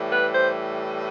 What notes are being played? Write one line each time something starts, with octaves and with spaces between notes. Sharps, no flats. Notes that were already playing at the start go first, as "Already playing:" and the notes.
Already playing: A2 E3 G3
B4
C5